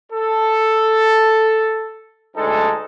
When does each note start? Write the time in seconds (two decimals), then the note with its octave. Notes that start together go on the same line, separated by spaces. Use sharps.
0.12 A4
2.36 D2 G#3 D#4 A4